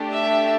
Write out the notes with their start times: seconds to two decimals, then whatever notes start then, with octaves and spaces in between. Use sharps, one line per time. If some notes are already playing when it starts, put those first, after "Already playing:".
Already playing: A3 D4 G4
0.13 E5